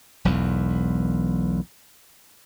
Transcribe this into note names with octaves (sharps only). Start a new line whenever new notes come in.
E1 B1 E2